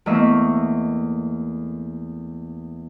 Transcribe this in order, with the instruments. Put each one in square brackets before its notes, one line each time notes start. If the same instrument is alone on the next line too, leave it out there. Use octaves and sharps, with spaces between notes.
[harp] E2 A3 A#3 D#5 E5 C#6